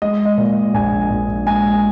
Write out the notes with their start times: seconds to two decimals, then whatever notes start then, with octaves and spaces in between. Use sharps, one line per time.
0.02 G#3 D#5
0.25 D#5
0.38 A#2
0.74 A#1 G#5
1.10 A#1
1.46 G#3 G#5